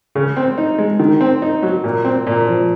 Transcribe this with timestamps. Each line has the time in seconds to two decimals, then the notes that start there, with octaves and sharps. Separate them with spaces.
0.15 C#3
0.37 C4
0.58 D#4
0.78 G#3
0.99 D#3
1.21 C4
1.42 D#4
1.62 F#3
1.84 A#2
2.05 C4
2.27 A#2
2.47 F3